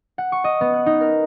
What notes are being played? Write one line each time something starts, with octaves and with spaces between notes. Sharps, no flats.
F#5
C#6
D#5
B3
F#6
D#4
A#4